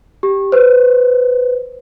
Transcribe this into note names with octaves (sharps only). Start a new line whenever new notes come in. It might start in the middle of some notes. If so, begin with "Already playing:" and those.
G4
B4 C5